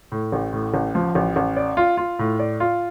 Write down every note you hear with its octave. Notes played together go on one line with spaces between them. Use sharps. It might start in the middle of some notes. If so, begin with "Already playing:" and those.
A2
A1
A2
A1
F3
A1
A1
D5
F4
F4
A2
D5
F4